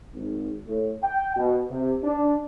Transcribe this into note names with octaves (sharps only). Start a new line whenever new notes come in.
G#1
A2
G5
B2
C3
D4